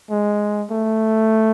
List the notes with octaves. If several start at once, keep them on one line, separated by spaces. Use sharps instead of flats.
G#3
A3